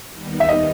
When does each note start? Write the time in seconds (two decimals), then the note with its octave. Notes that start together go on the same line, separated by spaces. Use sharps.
0.10 D#2 D#3 G3 B3 D#4
0.40 E5
0.49 D#5